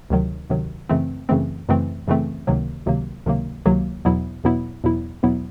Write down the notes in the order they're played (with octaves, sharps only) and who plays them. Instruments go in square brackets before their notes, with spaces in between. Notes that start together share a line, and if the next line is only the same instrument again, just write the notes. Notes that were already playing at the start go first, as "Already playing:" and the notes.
[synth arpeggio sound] D2 C3 D#3 F#3
D2 C3 D#3 F#3
F#2 C#3 E3 A3 C4
F#2 C#3 E3 A3 C4
F#2 C#3 E3 A3 C4
F#2 C#3 E3 A3 C4
C#2 C3 D#3 F#3 A#3
C#2 C3 D#3 F#3 A#3
C#2 C3 D#3 F#3 A#3
C#2 C3 D#3 F#3 A#3
E2 B2 F#3 B3 E4
E2 B2 F#3 B3 E4
E2 B2 F#3 B3 E4
E2 B2 F#3 B3 E4